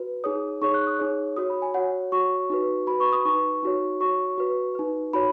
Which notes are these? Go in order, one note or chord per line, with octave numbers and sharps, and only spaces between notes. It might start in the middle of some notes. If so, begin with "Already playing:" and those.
Already playing: F#4 B4
D#4 G#4 C#5 D#6
D#4 G#4 C#5 C#6
F#6
D#6
D#4 G#4 C#5
F#4 C#5 D#6
B5
G#5
F#4 C#5 F#5
F#4 C#5 C#6
D#4 F#4 B4
F#4 B4 B5
C#6
D#6
D#4 B4 C#6
D#4 F#4 C#5
F#4 C#5 C#6
F#4 B4
D#4 B4
D#4 F#4 C#5 B5